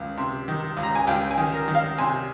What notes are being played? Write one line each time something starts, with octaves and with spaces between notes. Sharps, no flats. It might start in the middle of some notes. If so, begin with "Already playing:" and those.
Already playing: C#2 D#3
C3
D#3
C#2
A#5
G#5
C#2 G5
G#5
D#3
A#4
D#3
F5
C3 G#5